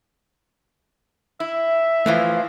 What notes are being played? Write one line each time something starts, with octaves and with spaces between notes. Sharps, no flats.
E4 E5
A2 E3 F3 A3 F5